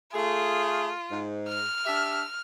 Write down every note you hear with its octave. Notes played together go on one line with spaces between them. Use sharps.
A3 F4 G#4
G#2
F6
D4 G4 E5